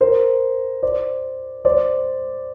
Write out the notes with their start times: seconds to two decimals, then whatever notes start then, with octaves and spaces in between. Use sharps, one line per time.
0.01 A#4 C5
0.83 C5 D5
1.65 C5 D5